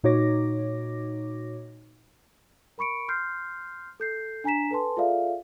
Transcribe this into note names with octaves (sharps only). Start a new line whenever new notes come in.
A#2 D#4 F#4 C#5 D6 A#6
A#4 B5 C#6 C#7 D7
C6 F6 G6 C7
A4 G6 C7
D4 G#5 A#5 B6 E7
A4 B4 G#5 A5 C6
F4 G#4 A4 D5 E5 F5